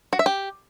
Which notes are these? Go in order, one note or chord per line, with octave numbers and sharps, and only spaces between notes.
F#4
E5
G4